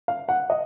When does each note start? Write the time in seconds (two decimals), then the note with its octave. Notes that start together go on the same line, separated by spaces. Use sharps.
0.08 F5
0.29 F#5
0.50 D#5